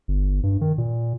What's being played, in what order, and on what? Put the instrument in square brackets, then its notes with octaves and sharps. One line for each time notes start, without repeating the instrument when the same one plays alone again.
[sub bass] G1
G2
D#3
A#2